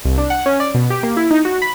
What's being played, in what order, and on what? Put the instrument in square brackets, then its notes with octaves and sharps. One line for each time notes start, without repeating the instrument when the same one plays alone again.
[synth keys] C2
D4
F#5
C#4
D5
B2
G4
A#3
E4
D#4
F#4
B5